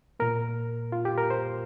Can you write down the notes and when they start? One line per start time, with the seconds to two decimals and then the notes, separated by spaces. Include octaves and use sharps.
0.20 A#2 A#3 A#4
0.92 F4
1.05 G4
1.18 A#4
1.30 C5